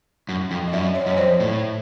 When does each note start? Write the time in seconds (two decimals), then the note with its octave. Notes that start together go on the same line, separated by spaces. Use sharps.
0.29 F#2
0.51 F2
0.67 D#5
0.73 F#2 D5 E5
0.95 C#5 D#5
1.06 F#2 C#5
1.17 F2 C5 D5
1.40 A2